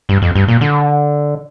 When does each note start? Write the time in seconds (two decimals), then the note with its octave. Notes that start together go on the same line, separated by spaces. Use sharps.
0.09 G2
0.22 F2
0.35 G2
0.48 A#2
0.61 D3